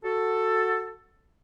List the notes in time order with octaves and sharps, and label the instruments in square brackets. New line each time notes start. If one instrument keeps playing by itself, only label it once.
[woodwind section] F#4 A4